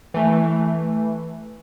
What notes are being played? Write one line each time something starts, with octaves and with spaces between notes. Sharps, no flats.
E3 A3